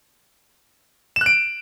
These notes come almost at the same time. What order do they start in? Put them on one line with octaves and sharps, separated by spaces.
E7 F#6 D7